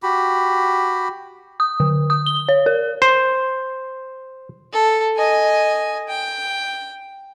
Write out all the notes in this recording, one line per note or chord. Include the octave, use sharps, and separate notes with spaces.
F#4 G4 B5
D#6
D3
D#6
G7
C#5
A#4
C5
A4
D#5 G#5
G5